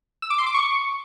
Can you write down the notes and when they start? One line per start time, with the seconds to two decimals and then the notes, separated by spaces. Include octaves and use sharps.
0.22 E6
0.30 D6
0.38 C6
0.46 D6
0.54 C#6